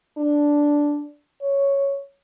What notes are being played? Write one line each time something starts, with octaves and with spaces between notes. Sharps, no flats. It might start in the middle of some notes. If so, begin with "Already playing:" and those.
D4
C#5